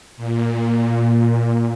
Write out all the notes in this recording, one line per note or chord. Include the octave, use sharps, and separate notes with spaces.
A#2
A#2